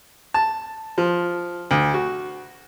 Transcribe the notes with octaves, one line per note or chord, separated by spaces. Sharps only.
A5
F3
D2
F#4